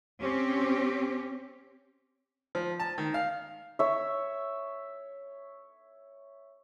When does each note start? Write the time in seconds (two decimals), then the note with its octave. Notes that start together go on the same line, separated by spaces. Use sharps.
0.21 C4 C#4 G4
2.55 F3
2.80 A5
2.98 D#3
3.14 F5
3.79 C#5 E5